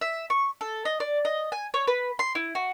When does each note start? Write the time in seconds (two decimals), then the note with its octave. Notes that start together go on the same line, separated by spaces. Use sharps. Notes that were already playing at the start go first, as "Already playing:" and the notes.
0.01 E5
0.30 C#6
0.61 A4
0.85 D#5
1.00 D5
1.25 D#5
1.52 G#5
1.74 C#5
1.87 B4
2.19 C6
2.35 E4
2.55 F#4